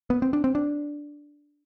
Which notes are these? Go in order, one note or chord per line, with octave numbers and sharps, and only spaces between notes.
B3
C4
D4
C4
D4